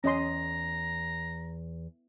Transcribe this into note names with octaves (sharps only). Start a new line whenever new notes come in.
E2 C#4 D#5 A#5 C6